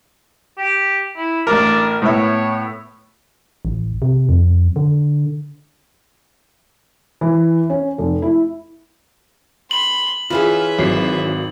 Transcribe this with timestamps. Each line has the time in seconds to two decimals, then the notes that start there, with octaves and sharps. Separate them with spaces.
0.58 G4
1.17 E4
1.47 A1 D4 A#4
2.02 A2 B3 C#5 E5
3.65 A1
4.02 C3
4.29 F2
4.76 D3
7.21 E3
7.70 C#4
7.98 F1
8.22 E4
9.71 B5 C6 F#7
10.30 E3 C#4 F4 G#4 B4 E5
10.78 G#1 F#3 C7